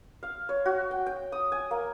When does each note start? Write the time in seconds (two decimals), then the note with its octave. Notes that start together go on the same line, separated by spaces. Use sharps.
0.23 F5
0.49 C#5
0.65 F#4
0.91 G5
1.06 G5
1.32 D#6
1.52 G#5
1.71 A#3